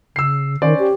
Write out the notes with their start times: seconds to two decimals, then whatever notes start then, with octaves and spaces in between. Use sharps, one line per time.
0.16 C#3 E6 C7
0.62 D#3 C#4 C5 D5
0.79 G4